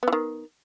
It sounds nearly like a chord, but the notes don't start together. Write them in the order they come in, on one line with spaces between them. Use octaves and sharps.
B3 E3 D#3